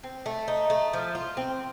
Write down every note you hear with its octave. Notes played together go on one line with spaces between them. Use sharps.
C4
A3
D#4
A3
F3
F4
C4